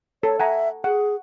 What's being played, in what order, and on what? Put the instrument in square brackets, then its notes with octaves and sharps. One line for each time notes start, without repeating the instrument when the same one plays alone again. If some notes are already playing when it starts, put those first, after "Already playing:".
[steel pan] A4 [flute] C#5
[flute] E5 [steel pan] F#5 G#5 A#5
[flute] G#4 [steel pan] F#5